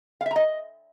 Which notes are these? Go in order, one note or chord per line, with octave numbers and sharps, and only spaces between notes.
F5
E5
A#5
D#5